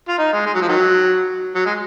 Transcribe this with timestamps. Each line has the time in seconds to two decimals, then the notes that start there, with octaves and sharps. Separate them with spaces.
0.09 F4
0.19 D#4
0.33 G#3
0.46 G#3
0.54 F#3
0.61 F3
0.68 D#3 F#3
1.55 F#3
1.66 G#3